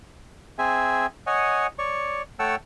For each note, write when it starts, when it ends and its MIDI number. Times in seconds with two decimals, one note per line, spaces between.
0.59 1.06 60
0.59 1.06 68
0.59 1.06 76
0.59 1.06 80
1.27 1.67 73
1.27 1.67 75
1.27 1.67 78
1.27 1.67 80
1.79 2.22 73
1.79 2.22 74
1.79 2.22 85
2.39 2.56 57
2.39 2.56 73
2.39 2.56 78
2.39 2.56 79
2.39 2.56 81
2.39 2.56 88